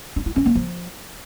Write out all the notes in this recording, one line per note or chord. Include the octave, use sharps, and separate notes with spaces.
D4
E4
C#4
A#3
F3